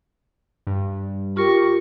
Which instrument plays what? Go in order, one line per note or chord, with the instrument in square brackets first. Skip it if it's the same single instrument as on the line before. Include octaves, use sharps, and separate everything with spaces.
[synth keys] G2
[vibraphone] F4 A#4 [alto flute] G4 [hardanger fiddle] C#6